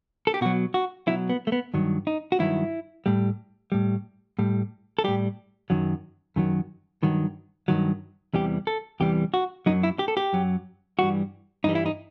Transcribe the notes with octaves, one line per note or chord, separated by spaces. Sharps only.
A4
G4
B2 F#3 F#4
F#4
B2 F#3 E4
B3
A3
B3
G2 D#3 F#3
D#4
F#4
G2 D#3 F#3 E4
A2 G3
A2 G3
A2 G3
A4
A2 G3 G4
F#2 D#3 F#3
F#2 D#3 F#3
G2 D#3 F#3
G2 D#3 F#3
E2 C3 E3 G3 G4
A4
E2 C3 E3 G3 G4
F#4
F#2 F#3 D#4
E4
G4
A4
G4
F#2 F#3
G2 E3 G3 F#4
G2 E3 G3 D#4
E4
D#4